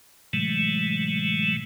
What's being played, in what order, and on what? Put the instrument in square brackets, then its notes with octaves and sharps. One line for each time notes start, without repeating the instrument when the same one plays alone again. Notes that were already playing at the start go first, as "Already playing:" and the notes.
[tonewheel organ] A2 C3 E3 F#3 G#3 A3